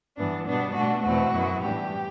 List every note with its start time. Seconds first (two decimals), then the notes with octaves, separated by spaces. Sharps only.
0.17 G2 E3 B3 D4
0.46 B2 G3 B3 D4
0.75 B2 A3 D4 F#4
1.04 E2 B2 A3 C4 E4 F#4
1.33 F#2 F#3 B3 E4
1.62 A2 E3 G3 D4 G4